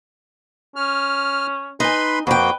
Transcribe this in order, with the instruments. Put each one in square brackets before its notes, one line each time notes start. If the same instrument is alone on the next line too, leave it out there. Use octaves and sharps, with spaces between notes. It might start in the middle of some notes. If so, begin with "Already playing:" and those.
[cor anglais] C#4 [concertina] F6
[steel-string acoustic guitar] D#4 G#5 [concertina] B4 B5 C6
[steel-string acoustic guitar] F2 G5 [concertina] A#3 F#4 [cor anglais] B4